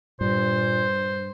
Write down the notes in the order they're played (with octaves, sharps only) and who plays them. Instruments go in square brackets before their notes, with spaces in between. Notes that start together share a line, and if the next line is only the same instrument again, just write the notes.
[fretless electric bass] G2 [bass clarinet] A#2 [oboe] C5